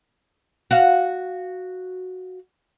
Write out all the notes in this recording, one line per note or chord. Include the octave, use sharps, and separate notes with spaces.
F#4 F5